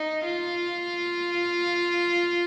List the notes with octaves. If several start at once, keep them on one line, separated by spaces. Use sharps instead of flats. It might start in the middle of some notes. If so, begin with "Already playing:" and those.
Already playing: D#4
F4